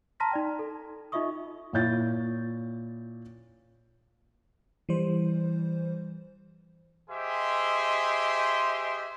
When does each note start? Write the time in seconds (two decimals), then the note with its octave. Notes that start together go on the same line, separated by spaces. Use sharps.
0.20 A5 A#5 C6 F6 A#6 B6
0.31 D#4 D5 G5
0.59 A4
1.12 D#4 F4 D#5 E5 C#6 D#6
1.73 A#2 E4 C#5 G6 A6
4.89 E3 G3 C5
7.10 G4 G#4 C5 D#5 E5 C6